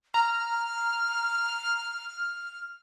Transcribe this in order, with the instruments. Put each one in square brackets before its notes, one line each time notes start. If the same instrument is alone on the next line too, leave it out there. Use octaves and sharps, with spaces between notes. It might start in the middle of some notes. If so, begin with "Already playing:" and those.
[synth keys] A#5 [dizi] F6